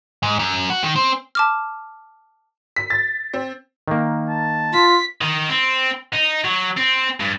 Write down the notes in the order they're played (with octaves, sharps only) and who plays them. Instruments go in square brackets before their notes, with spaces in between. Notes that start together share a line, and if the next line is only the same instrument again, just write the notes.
[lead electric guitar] G#2
F#2
F#4
D#3
C4
[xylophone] A5 D6 F6
[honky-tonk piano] B6
A6
C4
[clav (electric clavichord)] D#3 A#3
[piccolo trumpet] A5
[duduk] F4 [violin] B6
[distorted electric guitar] D#3
C4
D#4
F#3
C4
G2